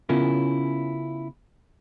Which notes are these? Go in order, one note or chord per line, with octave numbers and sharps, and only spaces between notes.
C#3 B3 C#4 E4 F4 A#4